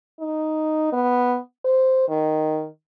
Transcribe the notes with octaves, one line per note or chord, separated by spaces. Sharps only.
D#4
B3
C5
D#3